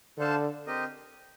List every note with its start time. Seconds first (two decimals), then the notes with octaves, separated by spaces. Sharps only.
0.18 D3 D4 A4 C5 F5 A5
0.67 C4 G4 A#4 D#5